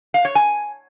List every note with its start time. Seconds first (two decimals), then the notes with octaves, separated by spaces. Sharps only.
0.14 F5
0.25 C#5
0.35 G#5